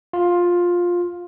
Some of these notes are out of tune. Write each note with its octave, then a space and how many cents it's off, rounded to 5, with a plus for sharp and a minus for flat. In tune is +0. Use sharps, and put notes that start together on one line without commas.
F4 +10